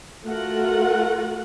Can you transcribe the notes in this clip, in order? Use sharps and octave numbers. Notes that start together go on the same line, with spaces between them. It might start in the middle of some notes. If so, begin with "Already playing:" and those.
A3 F4 F#4 A#4 F#5